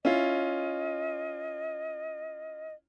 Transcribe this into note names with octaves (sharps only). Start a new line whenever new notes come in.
C#4 E4 F4 D#5